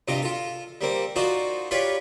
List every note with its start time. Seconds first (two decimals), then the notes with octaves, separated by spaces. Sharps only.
0.08 G2 C3 F4 D#5
0.22 F4 A4
0.81 G3 A#3 C4
1.16 D#4 F4 F#4 C5 D5
1.71 F4 G4 B4 C#5 D5 F5